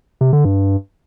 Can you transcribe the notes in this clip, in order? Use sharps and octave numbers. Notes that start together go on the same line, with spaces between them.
C3
D3
G2